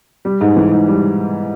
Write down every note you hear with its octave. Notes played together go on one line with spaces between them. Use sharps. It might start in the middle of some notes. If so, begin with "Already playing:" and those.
G3
G#2
E3
G#2
G3